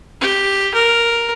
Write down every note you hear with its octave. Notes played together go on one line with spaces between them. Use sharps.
G4
A#4